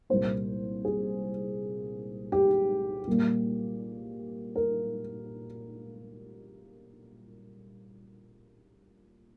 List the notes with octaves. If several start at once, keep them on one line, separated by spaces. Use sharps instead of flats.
C2 A#2 G3 A#3 C5
G#4
G4
A#2 G3 A#3
A#4